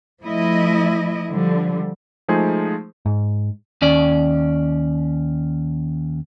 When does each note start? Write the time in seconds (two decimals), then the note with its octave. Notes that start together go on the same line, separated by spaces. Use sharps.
0.22 F3 A3 E4 D#5
1.30 D3 F3 G3
2.28 F3 G#3 A3 D#4 G#4 C5
3.06 G#2
3.82 D#2 C#4 D5